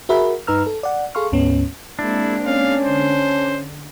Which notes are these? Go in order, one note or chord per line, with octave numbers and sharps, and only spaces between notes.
F#4 G#4 A#4 E5 B5
G2 D#4 B4 A#5 E6 F6
A4
D5 F#5
G#4 A4 F5 C6 C#6 F6
D2 G#2 B3 C#4
G#3 A#3 C4 D4 E4
C#4 F5
D3 C5